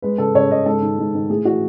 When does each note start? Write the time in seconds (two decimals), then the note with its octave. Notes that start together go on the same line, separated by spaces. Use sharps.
0.02 G#3 B4
0.18 C#3 A4
0.35 C#3 C#5
0.51 C#3 D#5
0.66 G#2 A4
0.82 D#3
0.99 G#2
1.14 D#3
1.29 A2 G#4
1.45 E3 F#4